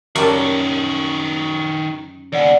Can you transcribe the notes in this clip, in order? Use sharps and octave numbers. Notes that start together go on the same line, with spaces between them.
F#2 D#3 G3 F#4 A5
D#2 C#3 D5 F#5